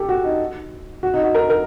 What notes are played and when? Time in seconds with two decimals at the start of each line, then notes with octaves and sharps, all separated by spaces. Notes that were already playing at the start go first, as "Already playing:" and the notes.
Already playing: G4 A4
0.09 F#4
0.24 D#4
1.03 F#4
1.14 D#4
1.24 F#4
1.35 A#4
1.50 A#4